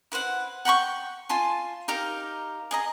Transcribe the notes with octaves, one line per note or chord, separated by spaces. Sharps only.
E4 B4 C5 F#5
F#5 G5 B5 C#6
F4 G#5 A5 C6
D#4 G4 A#4 F5
G#4 D#5 A#5